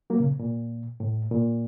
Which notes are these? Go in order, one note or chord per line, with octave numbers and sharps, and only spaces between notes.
F#3 A#3
A#2 C#3
A#2
A2
A#2